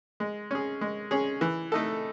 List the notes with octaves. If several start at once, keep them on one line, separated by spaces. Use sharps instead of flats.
G#3
C#4 G#4
G#3
C#4 G#4
E3
A3 D#4 A4